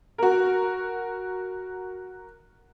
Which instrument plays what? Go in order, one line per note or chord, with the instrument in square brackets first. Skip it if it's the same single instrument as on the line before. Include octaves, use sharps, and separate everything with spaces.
[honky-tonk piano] F#4 A#4